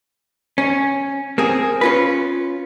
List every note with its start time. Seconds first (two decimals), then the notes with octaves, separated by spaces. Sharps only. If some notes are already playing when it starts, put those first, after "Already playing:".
0.58 C#4
1.38 A#3 C4 G#4
1.81 C#4 F4 B4